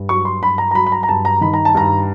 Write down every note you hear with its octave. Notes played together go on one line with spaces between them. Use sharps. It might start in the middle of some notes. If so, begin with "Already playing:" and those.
Already playing: G2
F#3 C#6
C6
G2 B5
A#5
A#5
F#3 B5
B5
A#5
A#5
G2 A5
A#5
D#3 B5
A#5
A5
G2 A#5